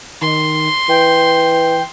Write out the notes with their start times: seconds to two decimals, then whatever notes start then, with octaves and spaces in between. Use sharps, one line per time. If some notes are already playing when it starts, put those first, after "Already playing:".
0.21 D#3 C6
0.89 E3 G5